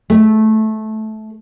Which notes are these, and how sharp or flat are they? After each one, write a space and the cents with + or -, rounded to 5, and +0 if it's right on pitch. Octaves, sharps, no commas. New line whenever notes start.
A3 -15